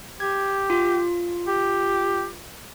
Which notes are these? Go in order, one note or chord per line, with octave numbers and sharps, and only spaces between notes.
G4 G#6
F4
G4